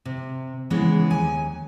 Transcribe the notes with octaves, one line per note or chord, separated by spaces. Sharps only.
C3
C#3 E3 G#3 B3
D#2 G#5